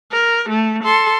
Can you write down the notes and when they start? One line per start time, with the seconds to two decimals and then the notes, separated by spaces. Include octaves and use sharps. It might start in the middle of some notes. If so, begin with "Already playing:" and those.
0.11 A#4
0.49 A3
0.84 A4 C6